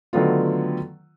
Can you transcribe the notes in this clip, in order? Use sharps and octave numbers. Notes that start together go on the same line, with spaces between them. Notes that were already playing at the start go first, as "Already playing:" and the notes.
D3 D#3 F#3 A3 B3 F4